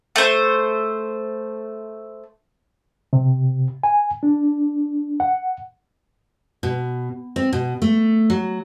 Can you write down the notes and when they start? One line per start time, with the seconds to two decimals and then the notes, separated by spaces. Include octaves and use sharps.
0.16 A3 C5
3.13 C3
3.83 G#5
4.23 D4
5.20 F#5
6.63 B2
7.36 C4
7.53 B2
7.82 A3
8.30 F#3